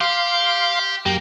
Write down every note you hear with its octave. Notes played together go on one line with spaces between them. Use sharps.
G4 F5 C6
F#2 A#3 G4